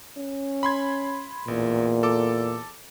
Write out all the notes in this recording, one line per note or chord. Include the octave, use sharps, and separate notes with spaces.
C#4
B5 C6 G#6
A1 E2 A#2
A4 D6